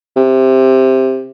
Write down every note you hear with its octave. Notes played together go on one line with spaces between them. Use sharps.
C3